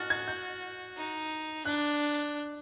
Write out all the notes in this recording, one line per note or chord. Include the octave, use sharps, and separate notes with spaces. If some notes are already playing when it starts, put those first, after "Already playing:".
Already playing: F#4 F6 F#6 A6
G#6
G6
D#4
D4 F#6